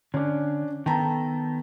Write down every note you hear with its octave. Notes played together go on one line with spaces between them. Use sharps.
D3 C#4 D4
D#3 B3 A4 G5 A5 A#5